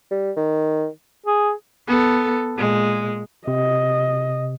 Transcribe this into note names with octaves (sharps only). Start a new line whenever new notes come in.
G3
D#3
G#4
B3 A4
A#2 G#3
C3 D#5